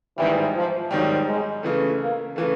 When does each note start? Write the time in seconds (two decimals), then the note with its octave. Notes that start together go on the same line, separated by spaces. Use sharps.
0.18 G#2 D#3 E3 G3
0.54 F3
0.91 G#2 D#3 F#3 G3
1.27 G#3
1.63 C#3 E3 A3
2.00 A#3
2.36 C#3 E3 A3